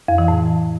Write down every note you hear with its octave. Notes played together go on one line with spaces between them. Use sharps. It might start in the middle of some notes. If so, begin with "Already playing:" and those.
F2
E3
A2